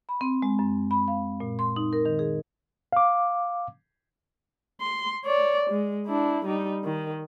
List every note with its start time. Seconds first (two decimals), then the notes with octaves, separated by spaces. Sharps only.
0.09 B5
0.21 C4
0.42 G#3
0.59 F#2
0.91 B5
1.08 F5
1.40 A#2
1.59 C6
1.76 D#4
1.93 A#4
2.06 D#3
2.19 G#4
2.93 F5 D6
4.81 C6
5.25 C#5 D5
5.70 G#3
6.06 D4 E4
6.45 G3 D#4
6.84 D#3